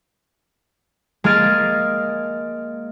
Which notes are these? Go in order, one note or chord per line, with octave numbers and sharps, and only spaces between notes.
G#3 A#3 G#4 F6 A6 D7